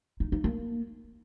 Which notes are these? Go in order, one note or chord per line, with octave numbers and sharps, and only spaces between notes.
D#4
D#4
A#3